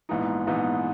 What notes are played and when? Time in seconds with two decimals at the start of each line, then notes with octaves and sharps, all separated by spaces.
0.09 A#1 G#2 E3 B3 D#4
0.47 A#1 G#2 E3 B3 D#4